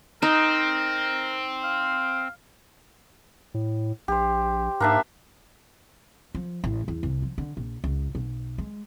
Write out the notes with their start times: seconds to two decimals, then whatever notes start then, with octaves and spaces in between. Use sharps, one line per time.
0.22 C4 D#4 A#4
1.64 F5
3.54 A2
4.08 A#1 G4 C5
4.80 G#2 A#3 D4 E5
6.35 F3
6.64 A1
6.88 E2
7.03 C2
7.22 F3
7.38 D3
7.57 A#1
7.84 C#2
8.15 B1
8.58 G#3